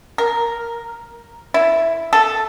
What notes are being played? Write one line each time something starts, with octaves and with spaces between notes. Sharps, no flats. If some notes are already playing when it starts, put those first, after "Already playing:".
A#4
E4
A4